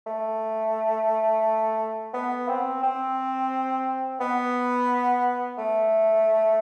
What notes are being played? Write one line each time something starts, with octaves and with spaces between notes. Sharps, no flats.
A3
B3
C4
C4
B3
A3